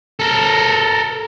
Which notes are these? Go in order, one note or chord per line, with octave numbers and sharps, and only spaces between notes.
A4 A#4